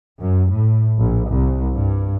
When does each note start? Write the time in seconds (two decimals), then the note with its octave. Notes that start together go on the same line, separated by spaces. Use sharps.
0.21 F#2
0.51 A2
1.00 A#1
1.30 C2
1.75 G2